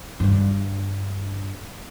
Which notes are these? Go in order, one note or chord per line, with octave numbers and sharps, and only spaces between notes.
G2 D3